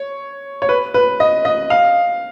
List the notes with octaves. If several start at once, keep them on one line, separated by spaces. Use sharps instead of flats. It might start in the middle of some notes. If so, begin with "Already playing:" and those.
Already playing: C#5
C#5
B4
B4
D#5
D#5
F5